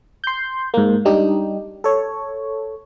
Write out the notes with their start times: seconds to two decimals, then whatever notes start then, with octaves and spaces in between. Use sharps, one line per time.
0.24 C6 G6
0.74 G#2 A#3
1.05 G3 D4 D#4 G4
1.84 A4 C#5